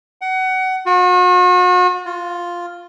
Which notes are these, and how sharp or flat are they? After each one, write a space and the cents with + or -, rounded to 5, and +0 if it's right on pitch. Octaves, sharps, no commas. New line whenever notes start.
F#5 +25
F#4 -40
F4 +0